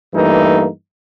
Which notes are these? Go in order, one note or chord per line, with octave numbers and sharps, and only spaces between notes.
G2 E3 A3 A#3 D#4